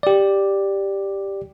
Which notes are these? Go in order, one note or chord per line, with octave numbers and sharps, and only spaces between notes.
G4 D5